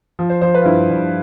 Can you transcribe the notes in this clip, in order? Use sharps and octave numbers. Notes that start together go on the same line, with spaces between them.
F3
C5
F3 C5
B4
F4
G2 E4
G2